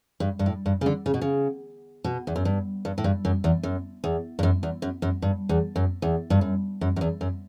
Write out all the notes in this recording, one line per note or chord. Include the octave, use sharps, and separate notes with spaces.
G2
G2
A2
G2
C#3
D3
C#3
B2
C#3
B2
E2
F#2
G2
G2
A2
G2
F#2
E2
F#2
E2
G2
F#2
E2
F#2
F#2
G2
E2
F#2
E2
G2
F#2
F#2
F#2
E2
F#2